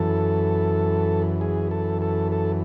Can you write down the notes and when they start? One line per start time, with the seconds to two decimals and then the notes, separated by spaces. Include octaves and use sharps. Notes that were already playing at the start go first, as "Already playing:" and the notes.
Already playing: F#2 E3 A4
1.41 G#4
1.71 A4
2.02 A4
2.32 A4